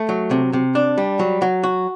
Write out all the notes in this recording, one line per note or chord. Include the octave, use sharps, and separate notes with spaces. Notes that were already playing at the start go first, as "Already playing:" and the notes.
Already playing: A3
F#3
C3
C3
D4
G3
F#3
F#3
F#4